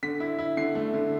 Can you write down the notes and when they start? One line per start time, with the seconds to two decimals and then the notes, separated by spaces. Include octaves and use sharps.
0.03 D3 B6
0.20 E4
0.38 E4
0.57 D3 C7
0.75 A3
0.94 D3